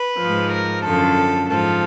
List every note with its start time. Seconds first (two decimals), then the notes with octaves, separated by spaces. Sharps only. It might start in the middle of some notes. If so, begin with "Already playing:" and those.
Already playing: B4
0.18 G#2 F3
0.50 A#4
0.82 F#2 D3 F3 A4
1.47 G#2 F3 A4